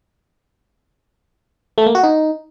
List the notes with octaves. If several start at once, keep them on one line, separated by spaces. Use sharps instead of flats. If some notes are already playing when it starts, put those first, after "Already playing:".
A3
A#3
F#4
D#4